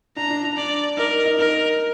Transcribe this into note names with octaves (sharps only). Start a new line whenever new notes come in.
D4 A#5
D4
D4
D4 D5
D#4 A#4
D#4
D#4 A#4